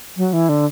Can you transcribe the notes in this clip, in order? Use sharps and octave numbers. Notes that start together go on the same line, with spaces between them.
F#3
E3
D3